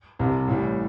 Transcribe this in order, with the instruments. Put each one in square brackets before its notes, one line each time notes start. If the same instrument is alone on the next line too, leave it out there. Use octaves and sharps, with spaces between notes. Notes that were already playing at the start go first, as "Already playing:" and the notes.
[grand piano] C2 C3 G3
A1 A2 E3 G3